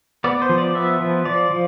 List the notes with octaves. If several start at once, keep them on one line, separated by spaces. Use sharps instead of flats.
B3 D5
C5
F3
D5
B3 E5
F3
F3 D5
F3